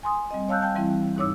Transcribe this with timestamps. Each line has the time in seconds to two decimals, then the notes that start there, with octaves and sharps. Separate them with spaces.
0.03 G#5 C6 D#6
0.31 G3 C4 D#5
0.49 C#5 F5 A5 E6 F#6 G6
0.61 G5 A5 G6
0.74 E3 G3 C4 E4
1.16 D#2 G#2 D#4 C#5 D6 E6